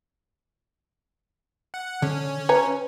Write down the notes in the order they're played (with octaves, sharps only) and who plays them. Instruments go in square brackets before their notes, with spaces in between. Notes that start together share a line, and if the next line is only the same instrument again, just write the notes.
[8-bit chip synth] F#5
[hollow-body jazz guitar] D3 [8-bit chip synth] C#4
[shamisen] B4 A#5 [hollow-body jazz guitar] C#5 G#5